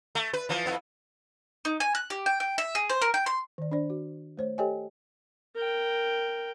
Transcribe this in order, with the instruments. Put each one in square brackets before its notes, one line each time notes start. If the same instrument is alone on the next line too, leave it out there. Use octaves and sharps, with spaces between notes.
[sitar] A3
B4
E3 F3
F2 B3 E4
[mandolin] D#4
G#5
F#6
G4
G5
G5
E5
G#4
C5
A#4
G5
C6
[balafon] D#3 D5
D4 C5 D5
F#4
A3 C5 C#5
G4 A4 C#5 D#5 G5 G#5
[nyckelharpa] A#4 G5